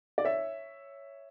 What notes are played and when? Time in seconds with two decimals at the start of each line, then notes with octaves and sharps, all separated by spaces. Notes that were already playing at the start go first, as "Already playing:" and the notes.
0.18 D5
0.25 C#5 E5